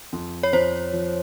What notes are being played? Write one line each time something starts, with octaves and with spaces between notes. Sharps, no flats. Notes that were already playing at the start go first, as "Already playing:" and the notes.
F2
C#5
F2 C5
F3